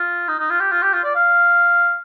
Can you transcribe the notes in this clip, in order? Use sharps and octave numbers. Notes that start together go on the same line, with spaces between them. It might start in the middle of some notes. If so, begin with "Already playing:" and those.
Already playing: F4
D#4
D#4
F4
G4
F4
G4
F4
D5
F5